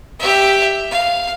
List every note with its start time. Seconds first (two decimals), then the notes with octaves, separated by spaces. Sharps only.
0.20 G4 E5
0.91 F5